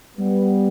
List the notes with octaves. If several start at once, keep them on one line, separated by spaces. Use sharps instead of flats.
G3 B3